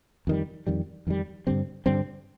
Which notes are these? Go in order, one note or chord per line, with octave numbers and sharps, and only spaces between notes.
F2 D#3 G3
F2 D#3 G3
F2 D#3 G3
G2 D3 G3 C4
G2 D3 G3 C4